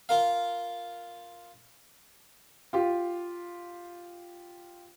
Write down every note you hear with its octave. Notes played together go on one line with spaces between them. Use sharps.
F4 A#4 F5
F4 G4